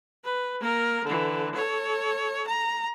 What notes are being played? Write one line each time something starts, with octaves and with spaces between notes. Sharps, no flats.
B4
A#3 A#4
D3 E3
A4 C#5
A#5